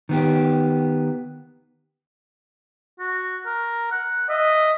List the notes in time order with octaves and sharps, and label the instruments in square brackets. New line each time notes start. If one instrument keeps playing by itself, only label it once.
[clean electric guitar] D#3 B3 G4
[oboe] F#4
A#4
F#5
[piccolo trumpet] D#5 [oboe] E5